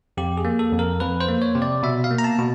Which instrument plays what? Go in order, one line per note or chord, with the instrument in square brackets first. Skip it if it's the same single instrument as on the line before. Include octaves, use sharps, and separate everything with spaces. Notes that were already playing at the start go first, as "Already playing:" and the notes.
[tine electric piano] F2 G4
G#4
A#3
A4
F2
A#4
F2 B4
C5
A#3
C#5
C3
D5
B2 E5
F5
A#3
A#5
A5
B2